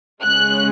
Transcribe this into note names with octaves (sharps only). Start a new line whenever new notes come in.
C#3 G#3 C#4 F#6